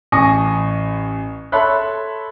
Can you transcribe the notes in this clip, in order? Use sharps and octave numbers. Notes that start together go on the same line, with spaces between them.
A1 G#5 C#6 D#6 A#6
A4 C#5 E5 B5 C6 F#6